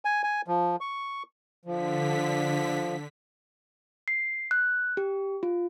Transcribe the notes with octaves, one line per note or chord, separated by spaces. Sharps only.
G#5
G#5
F3
C#6
D3 F3 B6
C7
F#6
G4
F4